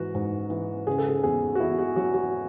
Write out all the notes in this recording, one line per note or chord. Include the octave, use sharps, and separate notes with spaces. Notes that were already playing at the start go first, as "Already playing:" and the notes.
Already playing: G#2 E3 F#4
G#2
E3
C#3 G#4
A4
G#4
E2 G#4
F#4
E2 E4
F#4
F#3 F#4
F#4